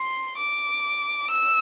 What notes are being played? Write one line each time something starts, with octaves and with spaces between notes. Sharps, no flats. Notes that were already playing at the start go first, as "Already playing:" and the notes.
Already playing: C6
D6
E6